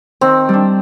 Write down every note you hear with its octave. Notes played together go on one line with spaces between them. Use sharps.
D#3 C4
G3 D4